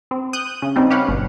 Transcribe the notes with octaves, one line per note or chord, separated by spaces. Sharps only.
C4
D#6 F#6 G6
C#3
G3 C4 C#4 D#4
G4 B4 C#5 F5 F#5
G1 B2